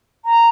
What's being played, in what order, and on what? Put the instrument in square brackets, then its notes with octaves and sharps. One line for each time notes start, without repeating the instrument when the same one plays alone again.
[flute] A#5